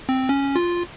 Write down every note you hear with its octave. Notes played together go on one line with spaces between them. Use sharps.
C4
C#4
F4